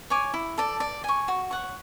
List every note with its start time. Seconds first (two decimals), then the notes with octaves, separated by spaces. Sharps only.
0.10 C#5 G#5 D6
0.34 E4
0.58 A4 D5
0.80 D5
1.04 G#5 C#6
1.28 F#4
1.51 C#5 F#5 C#6